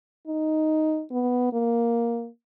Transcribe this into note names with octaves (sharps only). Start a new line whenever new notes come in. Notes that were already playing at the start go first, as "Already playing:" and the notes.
D#4
B3
A#3